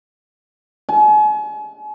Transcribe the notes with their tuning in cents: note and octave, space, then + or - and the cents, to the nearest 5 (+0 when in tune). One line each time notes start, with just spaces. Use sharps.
G#5 +40